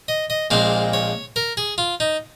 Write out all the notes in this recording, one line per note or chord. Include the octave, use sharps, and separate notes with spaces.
D#5
D#5
A#1 A#2 G#3 C4 F5
C#5
A#4
G#4
F4
D#4